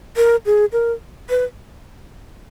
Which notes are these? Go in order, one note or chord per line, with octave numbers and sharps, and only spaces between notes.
A#4
G#4
A#4
B4